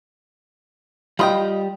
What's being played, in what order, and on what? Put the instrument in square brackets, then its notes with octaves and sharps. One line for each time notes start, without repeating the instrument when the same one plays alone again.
[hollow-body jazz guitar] G3 B5 [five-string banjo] F4 D#5 G5